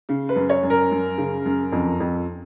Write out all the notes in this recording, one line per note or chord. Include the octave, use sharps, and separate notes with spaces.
C#3
B4
F#2
C#5
F#2
A#4
F#2
C#3
F#2
F2
F2